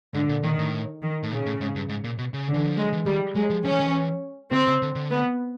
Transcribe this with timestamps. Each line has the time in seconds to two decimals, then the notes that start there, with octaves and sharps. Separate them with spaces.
0.14 G#2 D3
0.29 A#2
0.43 A#2 D#3
0.58 A2
1.03 D#3
1.23 A2
1.31 A#2 C#3
1.46 A2
1.61 G#2
1.76 G2
1.89 G#2
2.04 A#2
2.18 B2
2.34 C#3
2.48 D3
2.54 E3
2.66 F3
2.77 F#3 G#3
2.92 E3
3.06 D#3 G3
3.35 F#3 G#3
3.50 F3
3.65 F3 C#4
3.72 E3
3.80 D#3
3.87 E3
4.52 D3 C4
4.68 C#3
4.82 D3
4.96 D3
5.10 B3